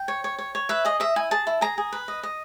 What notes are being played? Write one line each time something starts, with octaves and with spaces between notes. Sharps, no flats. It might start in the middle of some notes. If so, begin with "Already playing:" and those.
Already playing: G5
C#5
C#5
C#5
C#5
B4 E5
G#4 D#5
D#5 E5
E4 G#5
G#4 A5
E4
G#4 A#5
G#4
B4
D#5
D#5